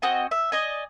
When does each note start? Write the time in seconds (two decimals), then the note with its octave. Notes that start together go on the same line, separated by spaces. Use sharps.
0.02 C4 F#4 D#5 G#5
0.31 E5
0.52 D5 D#5 G#5